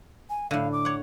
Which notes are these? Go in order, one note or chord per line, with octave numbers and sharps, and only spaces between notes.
G#5
A2 D3 F5
D6
C#5 F#5